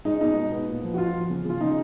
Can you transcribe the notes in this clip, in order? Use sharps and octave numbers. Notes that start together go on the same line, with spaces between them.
G#3 D#4
B2 D#4
B2
B3
A#2
F3
F#4
F3 F4
F3
C#3
C#3
F4
C#3 D#4